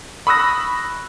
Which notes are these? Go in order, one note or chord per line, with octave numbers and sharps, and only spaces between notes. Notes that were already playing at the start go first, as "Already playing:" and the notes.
B5 C#6 D#6 E6 F#6 A#6